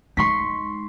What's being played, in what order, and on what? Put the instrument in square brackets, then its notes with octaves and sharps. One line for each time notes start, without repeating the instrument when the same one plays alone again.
[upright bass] G#3 D#4 [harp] C6 C#6 B6